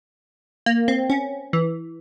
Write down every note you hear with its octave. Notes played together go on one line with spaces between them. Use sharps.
A#3
C4
C#4
E3